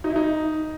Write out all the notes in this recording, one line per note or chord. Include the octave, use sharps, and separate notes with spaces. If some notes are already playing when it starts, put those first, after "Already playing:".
D#4
E4
D#4